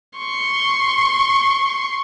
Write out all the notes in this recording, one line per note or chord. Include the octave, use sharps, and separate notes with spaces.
C6 C#6